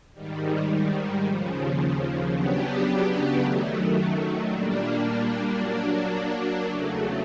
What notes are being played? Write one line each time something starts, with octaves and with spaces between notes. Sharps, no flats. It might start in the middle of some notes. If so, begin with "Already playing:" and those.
G#2 D#3 G3
D#2 C#3 F3
C#3 F#3 B3 D4 G4
F#2 D#3 F#3 A3
A#2 G3 A#3 D4
F#3 A#3 D4
E2 C#3 F#3 A3